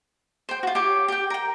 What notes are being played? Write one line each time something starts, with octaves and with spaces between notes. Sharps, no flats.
C5 G5
F4 F#4
G4 C#5 D6
G4 G5
A#4 G5